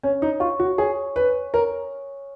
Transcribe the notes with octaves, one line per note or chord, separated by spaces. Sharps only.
C#4 C#5
D#4
F4 C#6
F#4
G#4 C#5
B4 G#5
A#4 C#5